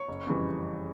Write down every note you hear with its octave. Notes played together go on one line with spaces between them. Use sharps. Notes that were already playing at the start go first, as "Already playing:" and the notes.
Already playing: C#5 C#6
F#1
F2 C#3 E3 G3